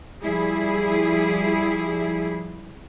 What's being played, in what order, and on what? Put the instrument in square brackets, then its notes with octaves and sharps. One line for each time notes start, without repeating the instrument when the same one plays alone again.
[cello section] F3 G3 E4 G#4